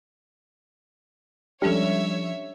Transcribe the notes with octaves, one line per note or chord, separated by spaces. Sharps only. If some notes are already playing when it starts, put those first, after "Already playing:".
F3 G3 G#3 C#4 D4 A4 C#5 E5